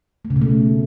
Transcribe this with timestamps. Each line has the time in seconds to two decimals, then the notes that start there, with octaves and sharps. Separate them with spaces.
0.25 A3
0.30 C#3
0.36 B2
0.42 A3